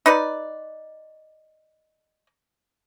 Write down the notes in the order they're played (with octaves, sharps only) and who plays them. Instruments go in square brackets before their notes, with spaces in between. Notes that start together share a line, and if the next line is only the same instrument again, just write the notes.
[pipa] D#4 B4 D5